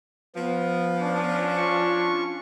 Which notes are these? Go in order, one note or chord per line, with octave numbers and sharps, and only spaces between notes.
F3 B3
C#4 D4
F4 C#6